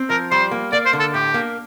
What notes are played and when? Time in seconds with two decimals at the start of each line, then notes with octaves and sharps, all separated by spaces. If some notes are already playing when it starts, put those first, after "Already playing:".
Already playing: C4
0.10 F3 A#4
0.32 G3 C5
0.51 A#3
0.73 A#3 D5
0.86 C5
0.93 D3
1.00 A4
1.14 A2 G4
1.34 A#3